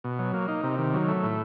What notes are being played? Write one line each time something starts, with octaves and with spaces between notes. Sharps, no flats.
B2
F#3
A#3
D#4
C3
D#3
F#3
A3
A2